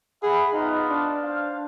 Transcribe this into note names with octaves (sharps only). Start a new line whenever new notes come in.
G#4 E5 F#5 B5
B3 D#4 F4 F5
D4
C5 F5